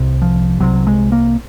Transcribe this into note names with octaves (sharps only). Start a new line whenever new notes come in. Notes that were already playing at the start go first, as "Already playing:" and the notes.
Already playing: C2 C3
F3
C2 C3 F#3
G#3
A#3